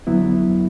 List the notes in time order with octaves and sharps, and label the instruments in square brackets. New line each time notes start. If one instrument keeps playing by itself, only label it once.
[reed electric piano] F2 D3 F#3 B3 E4